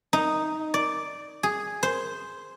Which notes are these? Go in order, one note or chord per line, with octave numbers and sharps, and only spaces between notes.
D#4
D5
G#4
C5